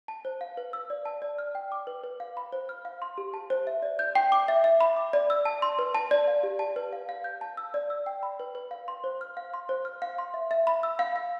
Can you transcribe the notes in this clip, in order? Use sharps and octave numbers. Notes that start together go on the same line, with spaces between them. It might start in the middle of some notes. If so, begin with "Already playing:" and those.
A5
C5
F5
B4
E6
D5
A5
D5
F6
G5
D6
B4
B4
F5
B5
C5
F6
F5
C6
G4
A5
C5
E5
D5
G6
G5
D6
E5
E5
B5
D6
D5
E6
A5
C6
B4
A5
D5
F5
G4
A5
B4
F5
F5
G6
A5
E6
D5
E6
G5
B5
B4
B4
F5
C6
C5
F6
F5
C6
C5
F6
F5
C6
E5
E5
B5
E6
F5
F5